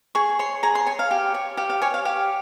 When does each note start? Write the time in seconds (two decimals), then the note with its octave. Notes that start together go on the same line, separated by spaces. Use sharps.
0.15 G#4 C#6
0.39 C#5 C6
0.63 G#4 A#5
0.75 C6
0.87 C#5 G#5
0.99 F5
1.11 G4
1.34 C#5
1.57 G4 F5
1.70 F5
1.82 C#5 G#5
1.94 F5
2.05 G4 F5